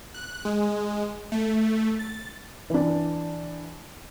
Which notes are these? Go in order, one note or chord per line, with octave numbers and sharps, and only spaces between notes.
F#6
G#3
A3
A6
E3 D4